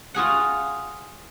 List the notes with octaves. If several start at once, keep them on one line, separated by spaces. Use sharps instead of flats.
F4 F#4 G#4 F#5